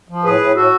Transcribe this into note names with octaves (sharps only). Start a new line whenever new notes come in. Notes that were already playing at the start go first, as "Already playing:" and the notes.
F3
A2 G#4 B4
A2
A2 F#4 A4